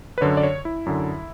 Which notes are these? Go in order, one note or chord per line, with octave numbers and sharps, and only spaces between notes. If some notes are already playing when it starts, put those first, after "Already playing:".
B4
F#2 D3 C#5
D5
C#5
E4
F#2 D3